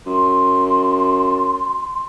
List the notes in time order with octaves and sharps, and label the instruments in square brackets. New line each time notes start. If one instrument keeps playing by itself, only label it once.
[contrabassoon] F#2 [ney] C6